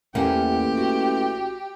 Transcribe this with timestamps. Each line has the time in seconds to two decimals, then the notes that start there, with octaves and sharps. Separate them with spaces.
0.15 A1 E2 A#3 G4 F#5 G#5
0.77 F#4